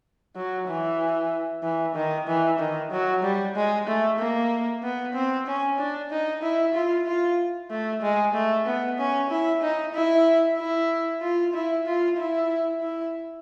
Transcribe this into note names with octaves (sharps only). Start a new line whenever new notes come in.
F#3
E3
E3
D#3
E3
D#3
F#3
G3
G#3
A3
A#3
B3
C4
C#4
D4
D#4
E4
F4
F4
A3
G#3
A3
B3
C#4
E4
D#4
E4
E4
F4
E4
F4
E4
E4